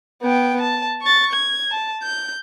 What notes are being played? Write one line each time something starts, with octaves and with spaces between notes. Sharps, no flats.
B3 G5
A5
C#6 A6
G#6
A5
G6